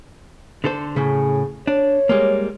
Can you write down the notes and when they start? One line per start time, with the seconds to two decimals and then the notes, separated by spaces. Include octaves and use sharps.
0.64 D3 A4 C5
0.96 A2 C#3 G#4
1.67 D4 C#5
2.09 G3 G#3 A#3